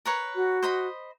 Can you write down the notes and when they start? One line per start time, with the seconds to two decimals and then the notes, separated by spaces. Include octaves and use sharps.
0.05 A#4 B4 C#5
0.36 F#4
0.62 C5 D#5 B5